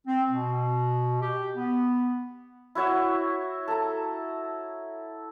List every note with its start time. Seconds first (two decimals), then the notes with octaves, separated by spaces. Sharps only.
0.07 C4
0.30 B2
1.20 G4
1.56 B3
2.75 E4 F#4 C#5 E5
3.68 A4 A#5